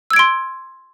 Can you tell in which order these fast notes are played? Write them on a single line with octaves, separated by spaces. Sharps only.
E6 G#6 D7 C6